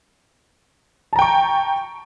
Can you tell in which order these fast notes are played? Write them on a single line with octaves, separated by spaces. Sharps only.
A5 A#5 G5 C#6